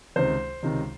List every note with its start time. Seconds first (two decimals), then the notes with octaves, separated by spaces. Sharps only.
0.16 C#2 C3 D#3 C5
0.63 C#2 C3 D#3